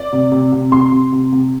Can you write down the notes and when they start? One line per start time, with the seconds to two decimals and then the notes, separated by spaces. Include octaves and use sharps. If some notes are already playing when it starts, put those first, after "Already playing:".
Already playing: D5
0.13 C3
0.32 C3
0.52 C3
0.72 C3 C6
0.92 C3
1.13 C3
1.32 C3